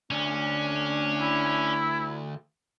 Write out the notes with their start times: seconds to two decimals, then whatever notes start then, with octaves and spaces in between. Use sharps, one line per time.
0.11 D2 C#4 D4
1.20 E4